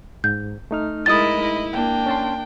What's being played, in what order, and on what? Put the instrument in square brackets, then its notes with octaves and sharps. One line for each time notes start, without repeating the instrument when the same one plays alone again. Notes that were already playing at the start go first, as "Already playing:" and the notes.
[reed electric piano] G#2 [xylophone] G6
[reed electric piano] A3 D#4 F6
[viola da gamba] G#3 E4 A#4 [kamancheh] D#5 B5 [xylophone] D#6 A6
[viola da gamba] E4
[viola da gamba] A#3 [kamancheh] D4 G5
[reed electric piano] C#4 A5 C6